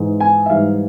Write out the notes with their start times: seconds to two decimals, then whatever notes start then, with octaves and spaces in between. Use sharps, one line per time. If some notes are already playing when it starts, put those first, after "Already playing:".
Already playing: G#2 E3 G#3
0.20 G#5
0.46 E5
0.50 G#2 E3 G3 F5